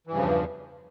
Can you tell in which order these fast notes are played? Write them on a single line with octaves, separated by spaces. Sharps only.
E3 G2 C#3 F3 E2